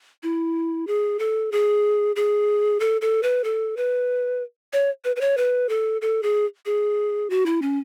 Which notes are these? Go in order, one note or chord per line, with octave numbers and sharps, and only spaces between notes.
E4
G#4
A4
G#4
G#4
A4
A4
B4
A4
B4
C#5
B4
B4
C#5
B4
A4
A4
G#4
G#4
F#4
E4
C#4